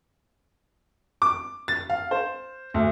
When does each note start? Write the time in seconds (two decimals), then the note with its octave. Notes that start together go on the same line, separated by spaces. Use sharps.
1.22 D6
1.68 A6
1.90 F5
2.11 C5
2.74 D2